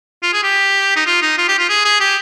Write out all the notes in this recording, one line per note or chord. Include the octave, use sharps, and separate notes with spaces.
F4
G#4
G4
D#4
F4
D#4
F4
G4
F4
G#4
G#4
G4